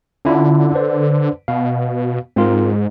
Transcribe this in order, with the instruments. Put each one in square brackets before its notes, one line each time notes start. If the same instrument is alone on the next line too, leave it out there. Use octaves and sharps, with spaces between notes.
[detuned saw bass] D3 [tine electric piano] C#4 E4 F4
[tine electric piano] B4 C5 D5
[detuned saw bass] B2 [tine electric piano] F5
[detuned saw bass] G#2 [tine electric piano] C4 F4 A#4